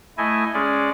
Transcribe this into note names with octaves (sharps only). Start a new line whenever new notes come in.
A3 E4 D#5 G#5
G#3 C#4 G#4 D5